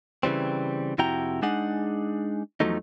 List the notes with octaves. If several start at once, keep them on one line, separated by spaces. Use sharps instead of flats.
C#3 E3 G3 C4
F2 C3 E4 F#4 G5 A#5
G#3 D4 D#4 G#4 F#5
E2 F3 F#3 A3 D#4